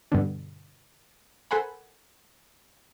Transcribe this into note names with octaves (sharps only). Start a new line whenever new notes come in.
G2 B2 D3
A4 A#4 C5 F#5 G#5 B5